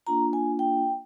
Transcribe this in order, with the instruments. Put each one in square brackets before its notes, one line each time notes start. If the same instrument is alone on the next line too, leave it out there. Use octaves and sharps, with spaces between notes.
[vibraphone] A#3 D4 F4 A#5
G#5
G5